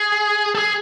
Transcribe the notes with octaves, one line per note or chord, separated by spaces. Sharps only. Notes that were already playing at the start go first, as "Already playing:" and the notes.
Already playing: G#4
A4
G#4